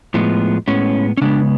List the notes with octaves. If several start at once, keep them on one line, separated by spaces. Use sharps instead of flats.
A2 F3 G#3 B3
A2 G#3 B3 C#4
C#4
C#3 G#3 B3 D4